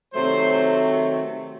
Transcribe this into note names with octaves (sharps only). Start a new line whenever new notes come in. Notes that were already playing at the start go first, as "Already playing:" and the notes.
C3 D#3 F#3 A3 C5